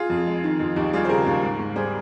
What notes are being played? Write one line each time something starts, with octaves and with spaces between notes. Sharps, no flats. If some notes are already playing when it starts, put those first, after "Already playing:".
Already playing: F4 G#4
F2
G#3
D#3
F2
D#2 D#4 G4
G3 F4 G#4
C5
C#3 G4 A#4
D#2
G#2
G#2
G3 G#4 C5